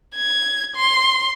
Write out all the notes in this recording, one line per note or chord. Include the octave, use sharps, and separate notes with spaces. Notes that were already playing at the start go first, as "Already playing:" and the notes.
G#6
C6